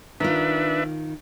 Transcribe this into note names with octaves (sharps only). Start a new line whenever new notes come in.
D#3 D4 F4 B4 E5